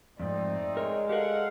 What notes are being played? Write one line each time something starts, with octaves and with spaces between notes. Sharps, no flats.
F2 G#2 A3 C4 D#4 D5
G#3 A#4 C#5
G4 A4 A#4 F5 F#5